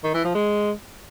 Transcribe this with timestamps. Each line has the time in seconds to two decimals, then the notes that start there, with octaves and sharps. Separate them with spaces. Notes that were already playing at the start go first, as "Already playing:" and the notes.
0.04 D#3
0.14 E3
0.24 F3
0.35 G#3